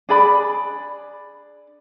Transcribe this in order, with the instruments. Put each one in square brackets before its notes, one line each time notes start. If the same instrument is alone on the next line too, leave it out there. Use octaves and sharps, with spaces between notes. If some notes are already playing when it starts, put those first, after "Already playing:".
[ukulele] D4 G#4 D5 B5